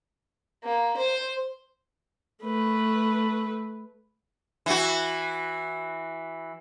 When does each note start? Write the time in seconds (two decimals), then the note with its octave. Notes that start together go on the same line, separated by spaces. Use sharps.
0.64 A#3
0.97 C5
2.44 A3 B4
4.66 E3 F#4